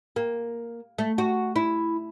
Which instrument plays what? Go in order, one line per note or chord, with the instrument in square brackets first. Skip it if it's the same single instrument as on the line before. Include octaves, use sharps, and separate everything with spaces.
[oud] A#3
A3
F#4
E4